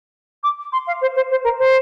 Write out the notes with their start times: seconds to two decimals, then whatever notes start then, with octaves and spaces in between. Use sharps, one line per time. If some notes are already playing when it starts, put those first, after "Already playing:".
0.43 D6
0.72 C6
0.87 F5
1.01 C5
1.16 C5
1.31 C5
1.44 A#4
1.59 C5